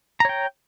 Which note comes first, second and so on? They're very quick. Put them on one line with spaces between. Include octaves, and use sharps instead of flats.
A#5 C#5 G5